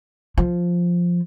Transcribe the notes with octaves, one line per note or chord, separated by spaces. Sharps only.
F3